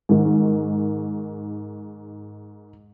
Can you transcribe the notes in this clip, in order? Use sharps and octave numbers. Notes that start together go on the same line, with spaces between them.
G#2 D#3